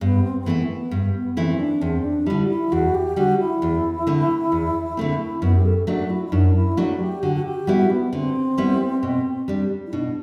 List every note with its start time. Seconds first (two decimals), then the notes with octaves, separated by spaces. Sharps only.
0.01 G2 B3
0.24 C4
0.40 C4
0.46 E3 A3 B3 E4
0.69 B3
0.91 G2
1.14 B3
1.37 E3 A3 C4 E4
1.60 D4
1.81 E2 C4
2.04 D4
2.26 D3 G3 E4
2.44 F#4
2.49 E4
2.72 E2 F#4
2.95 G4
3.16 D3 G3 F#4
3.39 E4
3.62 E2
4.07 D3 A3 C4
4.52 E2
4.97 D3 A3 C4
5.42 F#2 B3
5.56 G4
5.65 A4
5.87 F#3 A3 D4 F#4
6.10 E4
6.26 E4
6.32 F#2 D4
6.55 E4
6.77 F#3 A3 D4 F#4
7.00 G4
7.23 D3 F#4
7.36 F#4
7.45 G4
7.67 G3 B3 E4 F#4
7.90 B3
8.12 D3 C4
8.58 G3 B3 E4
9.03 B2
9.48 G3 D4
9.87 E4
9.93 B2 D4